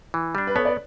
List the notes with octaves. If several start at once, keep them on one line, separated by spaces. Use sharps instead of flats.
E3
G3 D4
B4
B3 A4 C#5
B4 D5